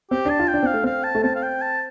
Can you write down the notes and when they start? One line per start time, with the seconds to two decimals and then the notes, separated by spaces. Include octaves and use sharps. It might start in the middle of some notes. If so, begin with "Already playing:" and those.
0.11 C4 G4
0.25 D4 A5
0.39 F4
0.48 G5
0.54 D4
0.63 C4 F5
0.74 A3
0.84 C4 F5
1.04 A5
1.15 A3
1.24 C4 A5
1.36 F5
1.43 G5
1.62 A5